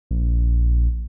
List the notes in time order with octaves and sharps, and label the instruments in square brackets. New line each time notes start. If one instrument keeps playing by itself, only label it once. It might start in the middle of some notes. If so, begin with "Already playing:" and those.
[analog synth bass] A#1